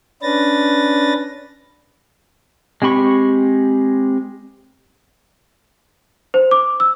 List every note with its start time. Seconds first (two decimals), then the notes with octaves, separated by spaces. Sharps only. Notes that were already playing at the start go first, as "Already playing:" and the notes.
0.22 C#4 D4 B4 A6 A#6
2.82 G#3 C4 G4 B5 C#6
6.34 C5
6.51 D6
6.80 E6